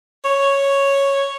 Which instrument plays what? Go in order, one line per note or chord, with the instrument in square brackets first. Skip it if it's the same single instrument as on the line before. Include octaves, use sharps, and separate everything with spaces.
[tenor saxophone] C#5